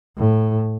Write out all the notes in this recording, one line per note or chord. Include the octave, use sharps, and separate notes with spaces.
A2